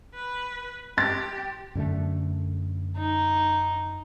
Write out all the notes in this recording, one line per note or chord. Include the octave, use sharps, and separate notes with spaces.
B4
G4 C6 A6
F#2 D3 A3
D#4